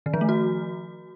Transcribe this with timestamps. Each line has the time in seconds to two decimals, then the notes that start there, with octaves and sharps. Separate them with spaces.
0.06 D#3
0.14 F3
0.21 A3
0.29 F#4